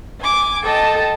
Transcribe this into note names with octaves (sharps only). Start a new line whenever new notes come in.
G#5 D6
A4 D#5 G5 A5